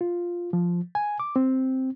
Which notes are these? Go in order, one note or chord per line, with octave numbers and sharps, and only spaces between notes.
F4
F3
G#5
D6
C4